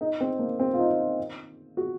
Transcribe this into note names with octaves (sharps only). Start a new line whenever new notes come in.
D#4
C4
A#3
C4
F4
D#4
F#4